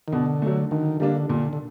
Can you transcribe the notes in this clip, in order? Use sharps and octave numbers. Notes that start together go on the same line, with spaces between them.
D#3
B2 D3
F#3 A3
D3 D#3
D3 G3 A#3 D4
A#2 D3
D3